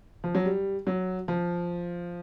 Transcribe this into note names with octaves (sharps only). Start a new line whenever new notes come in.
F3
F#3
G3
F#3
F3